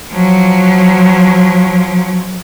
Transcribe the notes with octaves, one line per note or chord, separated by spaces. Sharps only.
F3 F#3